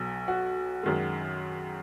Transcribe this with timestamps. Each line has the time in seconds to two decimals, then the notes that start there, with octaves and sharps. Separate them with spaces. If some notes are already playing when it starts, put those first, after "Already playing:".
Already playing: B1 B2 F#3
0.28 F#4
0.83 F#2 D#3 G#3